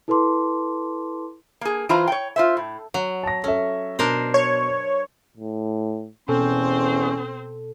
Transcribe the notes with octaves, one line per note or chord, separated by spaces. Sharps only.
E4 A4 B4 A5 C6 D6
A#3 G#4
E3 F4 C5 F5 A#5
C#5 G5
F4 C5 E5
A2
F#3
A5 A#6
C#4 A4 E5
B2 D4 A#4 C5
C#5
A2
E2 B2 C4 C#4 A4 C5